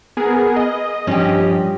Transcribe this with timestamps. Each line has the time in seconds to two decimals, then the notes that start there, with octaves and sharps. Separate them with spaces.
0.17 B3 G#4 A#4
0.56 D#5
1.07 G2 F3 C#4 D4 G4